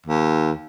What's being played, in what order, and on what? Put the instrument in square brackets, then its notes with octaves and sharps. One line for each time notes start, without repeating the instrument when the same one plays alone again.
[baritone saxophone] D#2